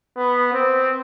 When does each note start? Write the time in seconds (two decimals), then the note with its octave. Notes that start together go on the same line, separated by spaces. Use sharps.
0.17 B3
0.53 C4